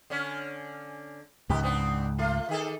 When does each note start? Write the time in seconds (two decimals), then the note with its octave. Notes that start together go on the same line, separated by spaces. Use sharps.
0.10 D3 C#4
1.49 C#2 G#2 D#3 B3 G4
1.63 B3 C4 D4
2.18 A3 F4
2.49 D#3 G#4 A4